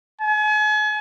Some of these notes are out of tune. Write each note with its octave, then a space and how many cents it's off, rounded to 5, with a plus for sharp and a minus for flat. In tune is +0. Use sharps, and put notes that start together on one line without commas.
G#5 +40